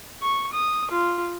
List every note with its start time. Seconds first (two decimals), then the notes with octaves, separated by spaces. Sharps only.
0.22 C#6
0.53 D#6
0.91 F4